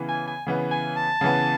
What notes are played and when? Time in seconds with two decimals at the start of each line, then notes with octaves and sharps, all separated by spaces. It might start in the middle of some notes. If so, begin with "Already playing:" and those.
Already playing: C#3 E3 B3
0.09 G#5
0.28 G#5
0.46 C#3 E3 B3
0.71 G#5
0.96 A5
1.21 C#3 E3 B3